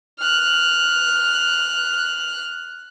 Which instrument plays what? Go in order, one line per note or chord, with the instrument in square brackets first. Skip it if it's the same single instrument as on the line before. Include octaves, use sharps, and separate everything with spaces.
[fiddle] F6 F#6